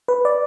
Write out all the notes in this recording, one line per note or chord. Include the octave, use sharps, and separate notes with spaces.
B4
D5